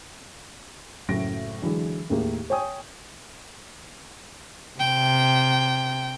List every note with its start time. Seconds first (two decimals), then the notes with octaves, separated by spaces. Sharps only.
1.08 F#1 F#2 A2 A3 A#6 D7
1.62 D3 E3 F#3 G#3
2.10 D#2 A2 A#3 G#4
2.50 C#5 G5 G#5 D#6
4.80 C3 G5